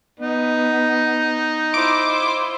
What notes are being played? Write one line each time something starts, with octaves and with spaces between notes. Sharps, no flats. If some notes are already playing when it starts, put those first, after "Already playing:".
B3 D#4
E4 F4 C5 D6